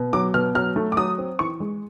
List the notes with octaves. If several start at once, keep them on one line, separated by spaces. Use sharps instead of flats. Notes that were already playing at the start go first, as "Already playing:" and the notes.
Already playing: B2
F#3 D6
B2 F6
F#3 F6
A3
D6
F#3 D#6
C4
E3 C#6
G#3